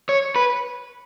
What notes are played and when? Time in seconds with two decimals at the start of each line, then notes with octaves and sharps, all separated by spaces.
0.09 C#5
0.36 B4